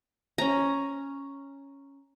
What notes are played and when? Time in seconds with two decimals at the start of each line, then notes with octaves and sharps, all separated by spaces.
0.38 C#4 A#5